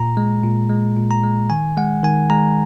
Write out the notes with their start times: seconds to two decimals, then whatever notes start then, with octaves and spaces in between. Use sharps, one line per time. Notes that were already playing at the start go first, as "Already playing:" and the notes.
Already playing: A#2 A#5
0.17 G#3
0.44 A#2
0.69 G#3
0.96 A#2
1.11 A#5
1.23 G#3
1.50 D#3 G#5
1.77 G#3 F#5
2.03 D#3 G#5
2.30 G#3 A#5